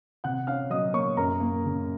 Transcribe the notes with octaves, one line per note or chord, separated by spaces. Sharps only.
C3 F#5 F#6
C#4 F5 F6
F#3 D#5 D#6
A#3 C#5 C#6
F#2 A#4 A#5
A#3
C#3